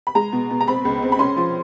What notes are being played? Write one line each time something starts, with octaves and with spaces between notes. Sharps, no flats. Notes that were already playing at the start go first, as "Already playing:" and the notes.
B5
G#3 A#5
B2
B2
A#5
C4 B5
C#2
C4
B5
C#4 C6
F3